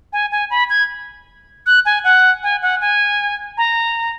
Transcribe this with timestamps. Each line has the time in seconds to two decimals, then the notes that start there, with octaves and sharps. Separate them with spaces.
0.13 G#5
0.31 G#5
0.50 B5
0.70 G#6
1.66 F#6
1.85 G#5
2.04 F#5
2.43 G#5
2.62 F#5
2.81 G#5
3.58 A#5